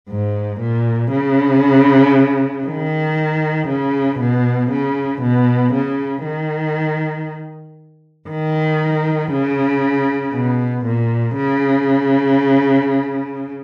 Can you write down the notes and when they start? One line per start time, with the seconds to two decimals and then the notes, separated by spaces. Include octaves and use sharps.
0.09 G#2
0.60 A#2
1.11 C#3
2.65 D#3
3.68 C#3
4.20 B2
4.71 C#3
5.22 B2
5.73 C#3
6.25 D#3
8.29 D#3
9.32 C#3
10.34 B2
10.86 A#2
11.37 C#3